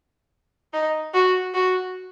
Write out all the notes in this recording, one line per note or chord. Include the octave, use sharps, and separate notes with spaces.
D#4
F#4
F#4